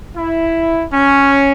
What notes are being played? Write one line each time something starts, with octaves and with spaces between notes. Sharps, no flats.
E4
C#4